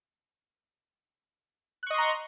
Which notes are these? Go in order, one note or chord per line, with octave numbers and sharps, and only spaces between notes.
D#5 A#5 C6 C#6 F#6